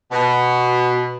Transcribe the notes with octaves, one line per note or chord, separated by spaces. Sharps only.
B2